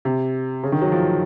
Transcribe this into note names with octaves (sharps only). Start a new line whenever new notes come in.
C3
C#3
D#3
F#3
F3